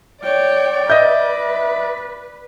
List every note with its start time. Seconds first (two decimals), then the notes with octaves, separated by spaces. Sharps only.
0.23 C#5 D5 G5
0.90 B4 D#5 E5 G6